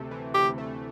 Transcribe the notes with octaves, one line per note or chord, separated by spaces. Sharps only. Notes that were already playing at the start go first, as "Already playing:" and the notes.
Already playing: D2 C3 A3
E3
D2 G4
A3